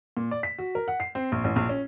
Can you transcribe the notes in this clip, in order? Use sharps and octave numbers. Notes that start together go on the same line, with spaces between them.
A#2
D5
B6
F#4
A#4
F#5
C7
C4
A#1
A1
A#1
C#4